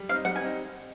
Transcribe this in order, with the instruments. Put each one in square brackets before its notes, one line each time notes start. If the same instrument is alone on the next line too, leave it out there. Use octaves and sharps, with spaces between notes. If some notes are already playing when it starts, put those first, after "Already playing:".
Already playing: [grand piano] G3
[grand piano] C4 [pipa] F5
[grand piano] D#4
[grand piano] G3 [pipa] F#5
[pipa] G#5
[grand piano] C4 D#4